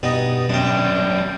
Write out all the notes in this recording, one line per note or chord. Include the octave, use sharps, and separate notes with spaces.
G2 B2 B3 D#4
F#2 G3 D4 G5